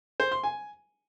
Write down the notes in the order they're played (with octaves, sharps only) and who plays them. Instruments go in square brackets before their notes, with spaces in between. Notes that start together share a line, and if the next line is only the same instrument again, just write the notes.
[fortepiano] C5
C6
G#5